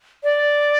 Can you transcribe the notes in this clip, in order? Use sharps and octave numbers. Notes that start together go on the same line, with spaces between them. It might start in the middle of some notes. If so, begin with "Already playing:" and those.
D5